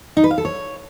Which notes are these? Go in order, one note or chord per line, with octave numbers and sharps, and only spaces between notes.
D#4
B4
F5
A4
C#5